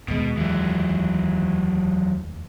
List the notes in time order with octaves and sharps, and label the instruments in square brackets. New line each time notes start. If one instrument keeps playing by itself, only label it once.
[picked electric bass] F1 D#2 G#3 [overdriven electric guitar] B2
[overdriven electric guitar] E3 F#3